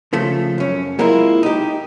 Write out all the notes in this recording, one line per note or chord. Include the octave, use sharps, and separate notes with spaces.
C#3 F3 A3
F#2 C#4
G#3 A#3 C4 E4 F4
D#4 G4